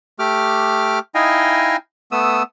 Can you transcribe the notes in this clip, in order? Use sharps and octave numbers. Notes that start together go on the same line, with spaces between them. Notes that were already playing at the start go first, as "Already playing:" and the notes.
A3 G4 D6 F6
D#4 E4 D#5 F5 G5 G#5
A3 B3 D#6 E6